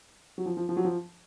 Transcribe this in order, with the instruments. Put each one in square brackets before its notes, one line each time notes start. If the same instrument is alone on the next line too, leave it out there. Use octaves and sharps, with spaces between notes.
[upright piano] F#3
F3
F3
F3
F#3
F3